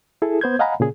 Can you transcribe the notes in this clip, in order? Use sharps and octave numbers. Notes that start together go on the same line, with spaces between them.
E4 G#4 A4
B3 C5 G6 G#6
D#5 F5 F#5 G#5 A#5 B5
A#2 C#3 G#4